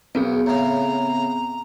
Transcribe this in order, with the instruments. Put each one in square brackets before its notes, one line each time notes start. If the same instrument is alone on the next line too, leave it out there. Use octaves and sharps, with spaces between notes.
[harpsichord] B1 [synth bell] B3 C4 G#4
[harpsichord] A2 C#3 [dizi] A#5